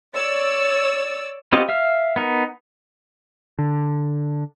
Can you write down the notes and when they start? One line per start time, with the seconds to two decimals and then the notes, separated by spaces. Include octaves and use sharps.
0.15 C#5 D5 E6 A6
1.52 B3 C4 F4 G4 D#5
1.69 E5 F5 F6
2.16 B3 D#4 A#4
3.59 D3